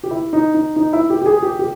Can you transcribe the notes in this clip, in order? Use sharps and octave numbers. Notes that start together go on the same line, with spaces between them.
G4
E4
D#4
D#4
D#4
E4
G4
G4
G#4
G4
G4